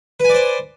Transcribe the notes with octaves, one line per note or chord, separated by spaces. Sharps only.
B4 C5 D5 G#5